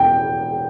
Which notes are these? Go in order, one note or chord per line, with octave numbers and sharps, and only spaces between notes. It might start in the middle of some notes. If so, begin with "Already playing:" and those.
Already playing: E1 E2 G5